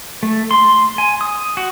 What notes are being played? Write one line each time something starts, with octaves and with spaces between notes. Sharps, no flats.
A3
C6
G#5
D#6
F#4